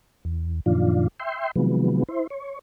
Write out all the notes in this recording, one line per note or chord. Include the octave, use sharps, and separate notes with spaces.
E2
F#2 A#2 D#3 F3 D4 F4
E5 G5 C6
C3 D#3 F3 F#3 G#3 B3
E4 C5
C#5